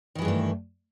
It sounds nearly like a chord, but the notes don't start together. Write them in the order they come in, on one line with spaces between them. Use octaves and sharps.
D#3 E3 G#3 G2 A3